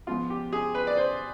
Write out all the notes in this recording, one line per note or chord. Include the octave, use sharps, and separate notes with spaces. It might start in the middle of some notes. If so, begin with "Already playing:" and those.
G#2 F3 B3 F4
G4
G#4
B4
D5
C5